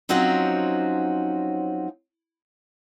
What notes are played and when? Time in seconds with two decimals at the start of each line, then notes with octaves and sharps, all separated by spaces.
0.09 F3 F#3 C4 C#4 D#4 F#4